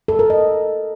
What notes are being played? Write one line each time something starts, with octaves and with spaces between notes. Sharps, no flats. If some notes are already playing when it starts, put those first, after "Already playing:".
A4
A#4
D#5